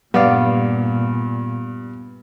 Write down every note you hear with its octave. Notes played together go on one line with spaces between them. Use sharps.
G2 A#2 B3 D5 F5